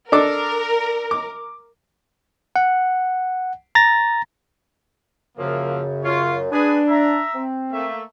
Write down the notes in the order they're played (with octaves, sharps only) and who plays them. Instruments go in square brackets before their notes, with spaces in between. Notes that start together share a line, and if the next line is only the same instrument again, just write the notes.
[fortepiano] D4 A4 D6 [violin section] A#4
[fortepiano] D6
[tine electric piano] F#5
A#5 A6 A#6
[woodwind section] F#2 C#3 [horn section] F3 A#3 E5
[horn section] F4 C#5
[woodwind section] D4 [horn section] G#4 B4 G#5
[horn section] E5 A#5
[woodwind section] C4
[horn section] A3 A#3 E5